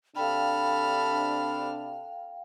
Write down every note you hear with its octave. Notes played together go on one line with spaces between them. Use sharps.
C3 D4 A4 F5 G5 B5 F6